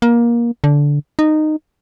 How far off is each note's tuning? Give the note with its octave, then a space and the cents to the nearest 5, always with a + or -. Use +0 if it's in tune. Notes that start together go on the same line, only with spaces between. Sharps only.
A#3 +20
D3 -15
D#4 -15